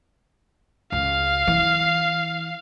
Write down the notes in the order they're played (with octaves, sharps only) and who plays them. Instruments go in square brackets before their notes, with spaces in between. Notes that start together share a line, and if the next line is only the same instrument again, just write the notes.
[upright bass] C#2 [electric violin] F5
[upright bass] E3